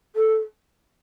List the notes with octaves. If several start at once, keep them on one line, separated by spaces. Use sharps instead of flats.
A4